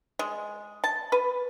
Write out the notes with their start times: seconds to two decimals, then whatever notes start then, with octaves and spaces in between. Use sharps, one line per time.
0.19 G#3
0.84 A5
1.12 B4